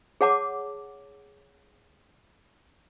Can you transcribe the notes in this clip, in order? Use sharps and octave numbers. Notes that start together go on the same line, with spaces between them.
G#4 C#5 F#5 A5 D6